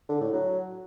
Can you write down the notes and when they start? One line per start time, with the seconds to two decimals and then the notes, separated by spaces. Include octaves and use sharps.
0.09 D3
0.21 A2
0.33 F#3